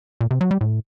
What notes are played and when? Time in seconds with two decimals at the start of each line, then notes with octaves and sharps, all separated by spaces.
0.21 A#2
0.31 C3
0.41 F#3
0.51 G3
0.61 A2